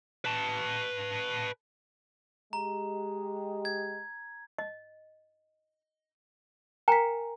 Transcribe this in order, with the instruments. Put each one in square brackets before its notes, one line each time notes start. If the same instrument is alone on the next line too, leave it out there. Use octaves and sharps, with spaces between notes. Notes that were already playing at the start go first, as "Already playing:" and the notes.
[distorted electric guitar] B4 A5
[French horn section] G#3 G4 [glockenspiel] A#5
[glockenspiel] G#6
[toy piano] D#5
[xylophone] A#4 B6 [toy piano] G5 G#5 A#5